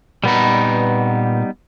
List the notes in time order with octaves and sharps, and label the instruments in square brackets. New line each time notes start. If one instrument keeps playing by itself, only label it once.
[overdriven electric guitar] A#2 B4 [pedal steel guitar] G3 B3 D#4